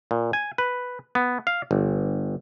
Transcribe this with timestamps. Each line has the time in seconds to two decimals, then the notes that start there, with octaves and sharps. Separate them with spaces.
0.11 A#2
0.33 G#5
0.58 B4
1.15 B3
1.47 F5
1.71 G1